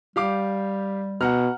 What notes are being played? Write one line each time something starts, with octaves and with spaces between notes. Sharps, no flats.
G3 G4 F5 D6
B2 F#5 A#5 F6